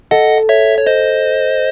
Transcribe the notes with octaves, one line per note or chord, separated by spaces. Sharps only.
A4 D#5 F#5
C#5 E5
C#5
C5 D#5